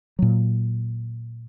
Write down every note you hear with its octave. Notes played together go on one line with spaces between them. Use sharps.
A#2 F#3